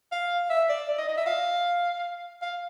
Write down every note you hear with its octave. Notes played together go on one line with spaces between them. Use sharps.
F5
E5
D5
D5
D#5
D#5
E5
F5
F5